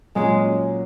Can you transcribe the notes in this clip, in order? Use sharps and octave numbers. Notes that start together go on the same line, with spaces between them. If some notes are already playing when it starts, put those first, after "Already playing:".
A#2 F#3 G#3 C#4